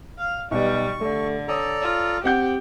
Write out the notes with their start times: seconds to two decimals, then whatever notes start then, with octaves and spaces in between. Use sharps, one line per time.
0.18 F5
0.51 B1 B2 G3 C#6
1.01 D3 A3
1.48 A4 C#5 D5 A#5 D#6
1.81 F4
2.24 C4 G4 F#5 G6